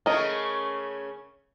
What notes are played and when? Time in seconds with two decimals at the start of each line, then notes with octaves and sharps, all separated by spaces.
0.06 C#3 A3 C#4 A#4 D#5